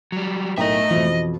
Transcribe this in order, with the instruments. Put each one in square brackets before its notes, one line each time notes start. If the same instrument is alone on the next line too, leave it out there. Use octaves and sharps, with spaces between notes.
[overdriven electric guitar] F#3 G3
[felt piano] B1 A2 A#4 [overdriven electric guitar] A3 E5 [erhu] D#5 [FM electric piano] G5 A#5
[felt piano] F2 B2 F3 [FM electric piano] E3